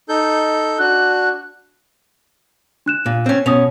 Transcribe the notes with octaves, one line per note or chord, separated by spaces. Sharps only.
D#4 A4 G6
D4 F#4 F#6
D4 F#6 E7
A#2
C4 C#4
B2 C#4 C#5 D#6 F7